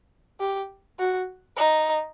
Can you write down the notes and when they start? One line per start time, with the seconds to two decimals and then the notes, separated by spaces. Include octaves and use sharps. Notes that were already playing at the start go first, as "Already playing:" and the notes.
0.40 G4
0.99 F#4
1.57 D#4